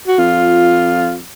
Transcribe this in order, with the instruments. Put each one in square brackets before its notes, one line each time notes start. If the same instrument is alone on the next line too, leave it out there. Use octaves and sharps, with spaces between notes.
[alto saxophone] F#4
[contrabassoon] F2 [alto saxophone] F4